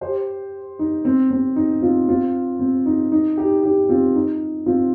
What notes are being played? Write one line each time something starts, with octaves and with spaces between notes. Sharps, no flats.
G4 C5
D#4
C4
C4
D#4
C4 F4
C4 F4
C4
D#4
D#4
D#4 G4
D#4 G4
C4 F4
D#4
C4 F4